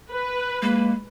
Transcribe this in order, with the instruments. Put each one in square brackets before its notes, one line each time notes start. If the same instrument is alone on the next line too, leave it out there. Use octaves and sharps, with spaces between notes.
[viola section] B4
[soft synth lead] G#3 [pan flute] A#3